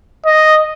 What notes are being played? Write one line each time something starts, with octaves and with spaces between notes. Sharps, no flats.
D#5